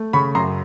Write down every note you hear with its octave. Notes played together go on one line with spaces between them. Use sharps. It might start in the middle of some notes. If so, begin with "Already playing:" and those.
Already playing: A3
C#3 B5 C#6
F#2 A#5 C6